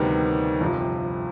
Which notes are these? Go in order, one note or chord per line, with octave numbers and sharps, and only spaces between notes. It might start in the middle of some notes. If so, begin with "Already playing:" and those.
Already playing: D2 C3 D#3 G3 B3
G1 F2 C3 F3